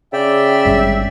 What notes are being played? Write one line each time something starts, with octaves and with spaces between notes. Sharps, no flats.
C#3 D5 E5 G5
G#1 G2